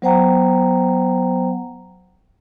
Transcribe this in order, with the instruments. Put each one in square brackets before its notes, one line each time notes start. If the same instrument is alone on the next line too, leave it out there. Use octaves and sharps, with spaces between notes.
[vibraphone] F#3 B3 C5 F#5 G5 A#5